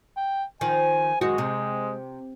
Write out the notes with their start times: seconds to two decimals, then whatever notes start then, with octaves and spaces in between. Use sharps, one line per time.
0.17 G5
0.61 D#3 F3 G#5
1.21 F#2 D#3 G#3 F#4
1.38 C3